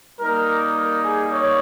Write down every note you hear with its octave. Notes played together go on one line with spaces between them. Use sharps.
G3 A#3 D#4 A#4
A#4
G#4
C#5